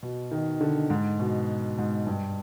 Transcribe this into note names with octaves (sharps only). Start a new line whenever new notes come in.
B2
D#3
D3
G#2
B2
G#2
G2